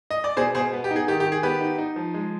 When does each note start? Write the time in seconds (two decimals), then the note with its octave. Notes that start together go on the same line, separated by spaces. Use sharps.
0.11 D#5
0.24 D5
0.37 B2 G#4 C5
0.55 B2 G#4 C5
0.73 B3
0.84 G4
0.91 D#4
0.96 G#4
1.08 D#3 G4
1.20 G4
1.26 D#3
1.32 G#4
1.43 B3 G4 B4
1.61 D#4
1.78 D#4
1.96 F3
2.14 G#3